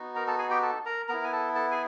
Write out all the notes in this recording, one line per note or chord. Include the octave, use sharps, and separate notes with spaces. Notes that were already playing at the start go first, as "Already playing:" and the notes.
Already playing: B3 D#4 F#4
A#4 A#5
A4 A5
G#4 G#5
G4 G5
A4 A5
A#4 A#5
B3 E4 A#4 A#5
G#5
A4 A5
A4 A5
G#4 G#5